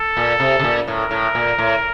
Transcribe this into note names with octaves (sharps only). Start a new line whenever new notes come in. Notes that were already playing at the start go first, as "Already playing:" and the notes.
Already playing: A4
A#2
C3
C3
A#2
A2 A#4
A2
A#2
A2